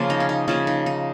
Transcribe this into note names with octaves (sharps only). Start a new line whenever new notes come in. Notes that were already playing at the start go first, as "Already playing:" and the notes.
Already playing: C#3 F3 A#3 F4
D#4
C#4
D#4
C#3 F3 A#3 C#4
D#4
D#4